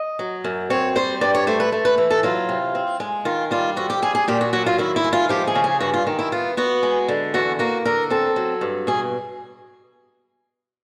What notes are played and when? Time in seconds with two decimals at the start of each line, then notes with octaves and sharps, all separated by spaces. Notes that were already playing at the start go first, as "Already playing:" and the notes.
Already playing: D#5
0.19 F#3
0.44 F#2
0.70 C4 C#5
0.95 G3 C5
1.21 G2 D5
1.35 C#5
1.47 A3 C5
1.60 B4
1.72 A3
1.85 B4
1.98 E3
2.10 A4
2.23 F#3 F4
2.49 C3
2.75 C4
3.00 G#3
3.25 D#3 F4
3.51 G3 F4
3.76 F2 F#4
3.90 G4
4.02 G3 G#4
4.15 G#4
4.28 A#2 G4
4.41 F#4
4.53 F#3 F#4
4.66 F4
4.78 D#3 E4
4.96 E4
5.04 G#3
5.13 F4
5.29 F3 G4
5.47 G#4
5.55 C#3
5.64 G#4
5.80 G2 F#4
5.94 F4
6.07 D#3
6.19 E4
6.32 B3 F4
6.57 B3 F#4
6.83 G#3
7.08 D3
7.34 E2 F#4
7.59 A#3 F#4
7.85 D3 A#4
8.10 C4 A4
8.36 F#3
8.61 G2
8.87 B2 G#4